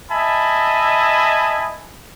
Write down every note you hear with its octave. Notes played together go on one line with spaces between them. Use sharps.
D#5 E5 G#5 A5 B5